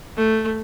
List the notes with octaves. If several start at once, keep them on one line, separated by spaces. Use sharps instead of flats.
A3